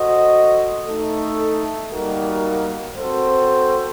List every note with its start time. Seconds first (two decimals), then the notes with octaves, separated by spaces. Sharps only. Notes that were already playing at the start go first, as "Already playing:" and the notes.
Already playing: F#4 A4 C5 D#5
0.85 A3 D#4 A4
1.90 G3 A#3 D#4 F#4 A#4
2.96 C4 F#4 A4 C5